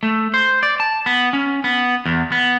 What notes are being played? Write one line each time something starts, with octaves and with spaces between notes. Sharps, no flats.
A3
C5
D5
A5
B3
C#4
B3
E2
B3